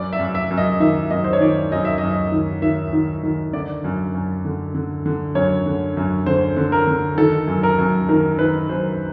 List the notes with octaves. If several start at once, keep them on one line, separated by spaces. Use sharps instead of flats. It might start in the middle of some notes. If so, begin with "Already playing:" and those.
Already playing: F#2 D5
E5
F#2
E5
F#2
D#5
D#3 E5
F#2 D#5
C5
C#5
D#3 D5
F#2 D#5
E5
F#2 D#5
D#3
D#3 E5
D#3
D#3
D3 D5
F#2
F#2
D3
D3
D3
F#2 C#5
D3
F#2
D3 C5
D3
A#4
D3
D#3 A4
F#2
A#4
F#2
D#3 A#4
D#3 B4
F#2 C5